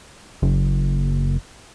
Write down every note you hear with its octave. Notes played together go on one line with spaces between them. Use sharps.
F#1